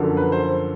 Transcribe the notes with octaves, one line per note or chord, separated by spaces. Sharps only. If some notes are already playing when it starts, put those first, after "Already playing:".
Already playing: F#2 D3 F3 A#3
B4
C5